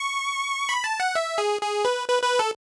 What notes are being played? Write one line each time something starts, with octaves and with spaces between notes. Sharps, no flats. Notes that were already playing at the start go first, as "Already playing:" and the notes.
Already playing: C#6
B5
A5
F#5
E5
G#4
G#4
B4
B4
B4
A4